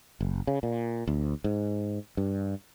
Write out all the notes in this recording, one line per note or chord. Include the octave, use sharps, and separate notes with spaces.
F#1
C#3
A#2
D2
G#2
G2